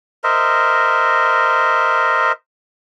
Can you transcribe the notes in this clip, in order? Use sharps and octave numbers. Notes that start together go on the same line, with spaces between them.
A#4 C5 D#5 E5